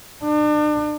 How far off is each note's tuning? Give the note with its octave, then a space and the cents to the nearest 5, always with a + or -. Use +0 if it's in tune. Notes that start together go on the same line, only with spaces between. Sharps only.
D4 +40